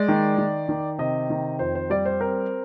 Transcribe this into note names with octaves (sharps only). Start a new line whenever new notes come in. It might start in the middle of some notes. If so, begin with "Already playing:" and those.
Already playing: G#3 D5
D#3
D#3
D#3
C3 D#5
D#3
F2 C5
C5
G3 D5
C5
C4 A#4